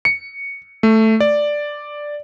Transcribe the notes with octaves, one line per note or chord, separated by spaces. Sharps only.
C#7
A3
D5